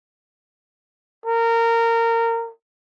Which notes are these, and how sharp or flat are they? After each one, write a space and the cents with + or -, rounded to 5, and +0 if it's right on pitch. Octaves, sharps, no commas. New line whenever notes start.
A#4 -20